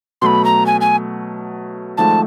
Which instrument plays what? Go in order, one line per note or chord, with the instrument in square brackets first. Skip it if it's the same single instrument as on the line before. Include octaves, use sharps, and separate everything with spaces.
[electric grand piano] B2 F#3 A3 [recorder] B5 C6
[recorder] A#5
G#5
G#5
[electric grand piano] G#1 G#2 F3 A3 [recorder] A5